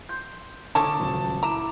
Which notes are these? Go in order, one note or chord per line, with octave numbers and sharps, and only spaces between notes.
C6 G6
D3 F3 A3 C#5 A5 D6 D#6
D#1 C#2 F#3
E4 A#5 D6 E7